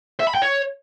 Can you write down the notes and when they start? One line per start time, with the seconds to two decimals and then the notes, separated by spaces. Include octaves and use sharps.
0.20 E5
0.27 B5
0.35 G5
0.42 C#5